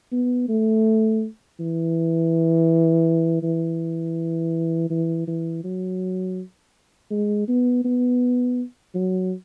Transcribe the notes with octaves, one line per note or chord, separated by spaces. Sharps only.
B3
A3
E3
E3
E3
E3
F#3
G#3
B3
B3
F#3